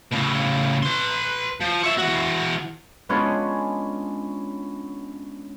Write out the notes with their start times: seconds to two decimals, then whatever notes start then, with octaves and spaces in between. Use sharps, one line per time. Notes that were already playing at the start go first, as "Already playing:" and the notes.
0.12 A2 C#3
0.83 B4 C6
1.61 F3
1.83 C#5 E5
1.98 E3 F#4
3.09 G#3 B3 C#4 D4 F4 G#4